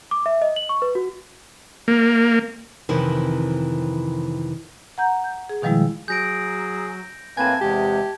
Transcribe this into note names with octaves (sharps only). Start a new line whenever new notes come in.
D6
E5
D#5
F#7
C#6
B4
F#4
A#3
F2 C3 D#3 E3
F#5 A#5 G6
G6
G#4
B2 D#3 F3 G3 G#3 E4
F#3 G#4 G6 A#6 D7
A2 A#3 C4 B4 G#5 A5 G#6
E2 C3 G#3 G4